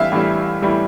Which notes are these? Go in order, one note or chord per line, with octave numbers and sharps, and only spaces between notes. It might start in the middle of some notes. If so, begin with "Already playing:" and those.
Already playing: A2 E3 G3 E5 F5
A2 E3 G3
A2 E3 G3